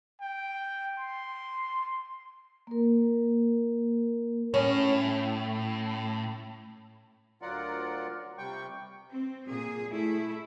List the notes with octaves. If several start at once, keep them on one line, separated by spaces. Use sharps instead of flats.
G5
C6
A#3 A#4
A2 C#4
D2 F#3 F4 A#4 D5 F#5
C3 G3 G5 C#6
C4
A#2 G#4
A3 E4